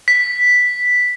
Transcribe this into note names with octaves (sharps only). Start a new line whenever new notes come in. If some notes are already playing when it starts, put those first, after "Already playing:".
B6